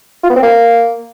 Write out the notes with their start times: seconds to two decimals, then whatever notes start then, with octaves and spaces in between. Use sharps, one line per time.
0.23 F4
0.30 B3
0.36 C4
0.42 A#3